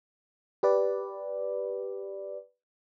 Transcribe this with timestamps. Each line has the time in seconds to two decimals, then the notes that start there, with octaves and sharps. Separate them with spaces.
0.63 G4 B4 D5